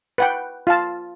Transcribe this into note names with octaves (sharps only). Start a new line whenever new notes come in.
B4 F#5 G5
F4 F5 A5